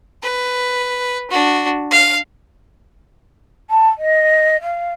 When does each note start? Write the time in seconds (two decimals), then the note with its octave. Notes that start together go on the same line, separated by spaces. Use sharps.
0.22 B4
1.30 D4 F#4
1.91 F5 F6
3.70 A5
3.98 D#5
4.61 F5